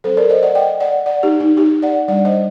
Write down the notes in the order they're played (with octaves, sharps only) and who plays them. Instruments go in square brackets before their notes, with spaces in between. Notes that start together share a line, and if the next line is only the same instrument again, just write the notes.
[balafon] F#3 C4 A4 C5
A#4 D5
C5 D#5
D5 F#5
D#5 G5
D5 F#5
D5 F#5
D#4 G4
D#4
D#4 G4
D5 F#5
G3 D4 D5 F#5
C5 D#5